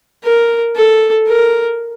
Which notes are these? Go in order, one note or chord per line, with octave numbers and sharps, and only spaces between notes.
A#4
A4
A#4